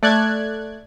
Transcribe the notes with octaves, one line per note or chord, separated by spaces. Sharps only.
A3 D5 F#6 G#6